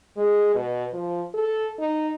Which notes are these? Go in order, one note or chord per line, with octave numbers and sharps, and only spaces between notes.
G#3
B2
F3
A4
D#4